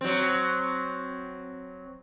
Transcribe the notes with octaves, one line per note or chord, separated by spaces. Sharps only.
F#3 C4